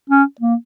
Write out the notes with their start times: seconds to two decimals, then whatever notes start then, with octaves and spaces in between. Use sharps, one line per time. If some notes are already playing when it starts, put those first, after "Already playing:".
0.10 C#4
0.41 A#3